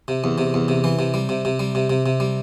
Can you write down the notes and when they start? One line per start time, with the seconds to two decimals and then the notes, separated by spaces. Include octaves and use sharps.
0.08 C3
0.24 E2
0.38 C3
0.54 E2
0.68 C3
0.84 E3
0.99 C3
1.14 G3
1.29 C3
1.45 C3
1.59 G3
1.75 C3
1.90 C3
2.06 C3
2.20 G3